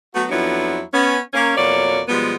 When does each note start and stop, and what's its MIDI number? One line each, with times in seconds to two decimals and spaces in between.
0.14 0.25 54
0.14 0.25 57
0.14 0.25 59
0.14 0.25 66
0.29 0.81 41
0.29 0.81 53
0.29 0.81 54
0.29 0.81 59
0.29 0.81 62
0.29 0.81 64
0.94 1.19 59
0.94 1.19 61
1.34 1.56 58
1.34 1.56 61
1.57 2.01 41
1.57 2.01 47
1.57 2.01 54
1.57 2.01 58
1.57 2.01 73
1.57 2.01 74
2.08 2.36 47
2.08 2.36 53
2.08 2.36 55
2.08 2.36 56
2.08 2.36 59